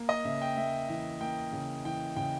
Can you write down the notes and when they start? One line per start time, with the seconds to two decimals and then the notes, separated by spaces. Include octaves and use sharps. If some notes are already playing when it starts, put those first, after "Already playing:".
Already playing: A#3
0.09 D#5
0.25 C#3 E5
0.42 G5
0.57 A#3 E5
0.89 E3 E5
1.21 A#3 G5
1.53 C#3
1.85 E3 G5
2.16 C#3 G5